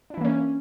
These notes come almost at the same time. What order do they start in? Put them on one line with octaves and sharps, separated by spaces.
D4 E4 E3 A#3 C#4